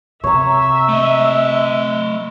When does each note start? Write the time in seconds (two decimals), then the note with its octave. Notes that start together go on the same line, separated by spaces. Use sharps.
0.24 C3 C#5 E5 A#5
0.89 A3 D#5